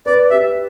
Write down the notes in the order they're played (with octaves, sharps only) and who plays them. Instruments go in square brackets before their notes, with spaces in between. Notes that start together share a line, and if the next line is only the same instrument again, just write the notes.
[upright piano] B4 [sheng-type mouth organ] D5
[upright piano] G4 [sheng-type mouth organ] E5